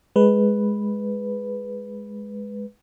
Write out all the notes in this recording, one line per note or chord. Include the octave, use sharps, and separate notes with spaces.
G#3 B4